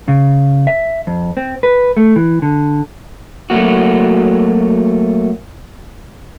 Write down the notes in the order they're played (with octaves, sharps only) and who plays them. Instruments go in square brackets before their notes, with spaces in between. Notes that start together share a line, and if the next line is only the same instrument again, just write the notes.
[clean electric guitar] C#3
E5
F2
C4
B4
A3
E3
D3
[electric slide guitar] F#3 A3 A#3 F#4